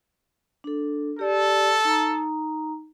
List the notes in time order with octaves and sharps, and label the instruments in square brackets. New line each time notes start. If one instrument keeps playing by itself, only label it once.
[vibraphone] D4 A4
[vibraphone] G4 D5 [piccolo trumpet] A4
[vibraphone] D#4 A#5